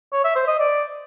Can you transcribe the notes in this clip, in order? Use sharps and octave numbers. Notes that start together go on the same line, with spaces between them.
C#5
E5
C5
D#5
D5